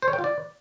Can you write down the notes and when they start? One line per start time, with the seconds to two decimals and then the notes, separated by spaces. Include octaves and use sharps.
0.02 C5
0.08 C#5
0.13 G5
0.19 F4
0.24 D5